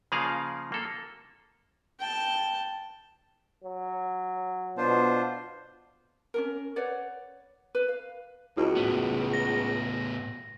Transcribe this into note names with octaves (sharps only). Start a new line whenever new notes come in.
C#3 F3 A#3 G#4 D5 F5
A#3 A4
G5 A5
F#3
B2 D4 F4 C5
C#4 D4 A#4
B4 C#5 D5 F#5
B4
F5
C#2 E4 F#4
A2 B3
A#6